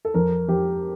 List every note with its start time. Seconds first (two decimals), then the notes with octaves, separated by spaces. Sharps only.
0.05 A4
0.14 F2 A#4
0.48 F2 G4